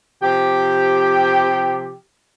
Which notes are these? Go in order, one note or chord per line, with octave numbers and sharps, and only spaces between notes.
C3 F3 G4